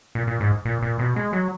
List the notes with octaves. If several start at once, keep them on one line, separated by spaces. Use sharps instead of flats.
A#2
A#2
G#2
A#2
A#2
B2
G#3
F#3